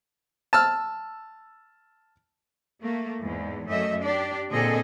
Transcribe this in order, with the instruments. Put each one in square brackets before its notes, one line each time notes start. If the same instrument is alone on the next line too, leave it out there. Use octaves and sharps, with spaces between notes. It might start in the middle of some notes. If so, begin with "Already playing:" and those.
[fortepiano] A5 E6 F6
[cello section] A3 A#3
E2 G#2
F#2 A3 D#5 E5
D4 G4 D5
A#2 D3 C4 G#4 A4 D#5